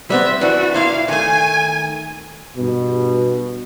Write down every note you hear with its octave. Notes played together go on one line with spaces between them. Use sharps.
G3 B3 C4 E5
E3 D4 F#4
A#2 E4 E5 F5
D#3 A3 G#5
G2 B2